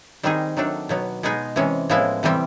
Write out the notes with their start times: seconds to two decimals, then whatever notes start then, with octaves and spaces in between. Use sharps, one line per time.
0.23 D#3 G3 C4 D#4 G#4
0.57 D#3 F#3 A3 D4
0.89 B2 F#3 B3
1.23 B2 G#3 B3 D#4 G#4
1.56 C3 E3 G#3 C#4
1.89 A2 F3 G#3 B3 E4
2.23 C3 E3 G3 C4